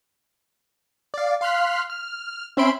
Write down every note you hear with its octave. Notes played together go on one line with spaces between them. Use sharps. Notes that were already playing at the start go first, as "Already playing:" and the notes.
D5 F5
F5 C6 F6 F#6 B6
F6
C4 C#4 E5 B5 C6 D7